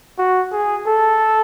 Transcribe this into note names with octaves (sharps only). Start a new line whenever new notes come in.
F#4
G#4
A4